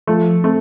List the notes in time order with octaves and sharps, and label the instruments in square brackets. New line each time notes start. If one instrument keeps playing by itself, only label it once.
[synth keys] F3 [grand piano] A3
[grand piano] A3 [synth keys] C4